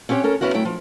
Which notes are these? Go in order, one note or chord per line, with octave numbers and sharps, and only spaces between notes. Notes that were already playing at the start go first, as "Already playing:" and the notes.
C4 C#4 G4 C#5 F#5 G5
C#4 A4 A#4
F2 C#3 B3 C#4 E4 F#4
F#3 A3 E4 G5
F3